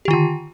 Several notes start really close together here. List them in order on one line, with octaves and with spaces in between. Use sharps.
G4 D#3 F4 D3